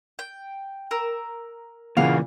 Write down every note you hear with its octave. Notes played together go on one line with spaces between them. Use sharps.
G5
A#4 E6
A#2 C#3 E3 A#3 C#5 F5 F#5